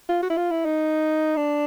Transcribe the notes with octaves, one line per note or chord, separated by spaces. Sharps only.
F4
F#4
E4
F4
E4
D#4
D4